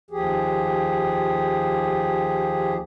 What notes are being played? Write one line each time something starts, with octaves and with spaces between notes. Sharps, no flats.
D#2 F3 G4 G#4